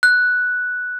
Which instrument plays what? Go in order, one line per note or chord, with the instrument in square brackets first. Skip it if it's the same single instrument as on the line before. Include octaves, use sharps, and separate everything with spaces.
[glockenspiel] F#6